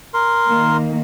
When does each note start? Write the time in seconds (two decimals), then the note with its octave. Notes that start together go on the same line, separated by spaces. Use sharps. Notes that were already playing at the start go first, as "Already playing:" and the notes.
0.14 A#4 C6
0.46 D#3 A#3